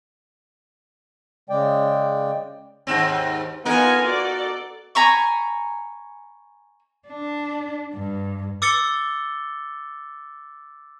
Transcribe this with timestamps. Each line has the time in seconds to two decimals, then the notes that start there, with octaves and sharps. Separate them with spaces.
1.50 C#3 G#3 D5 G5
2.87 D#2 G#2 C4
3.65 B3 D#4 F4 A4 A#4 G#5
4.06 F#4 A4 D5
4.95 G#5 A#5 B5 C#6
7.08 D4
7.93 G2
8.62 D6 E6 A6 C#7 G7